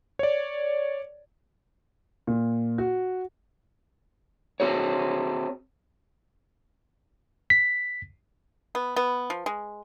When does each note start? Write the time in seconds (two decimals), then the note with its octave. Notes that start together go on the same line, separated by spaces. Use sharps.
0.19 C#5 D5
2.27 A#2
2.78 F#4
4.60 C4 F#4 G#4 C#5
7.50 B6
8.75 B3
8.96 B3
9.30 F3
9.46 G#3